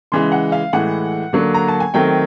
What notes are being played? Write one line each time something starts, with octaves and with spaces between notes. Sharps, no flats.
C#3 E3 G#3 C6
F#5
F5
A2 E3 G#3 F#5
D3 F#3 A#3
A#5
A5
G#5
D#3 F#3 A3 C4 G5